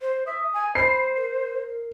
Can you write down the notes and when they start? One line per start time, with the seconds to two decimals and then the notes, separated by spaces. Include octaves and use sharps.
0.01 C5
0.27 E5 D#6
0.54 G#5
0.75 C5 B5 C7
1.16 A#4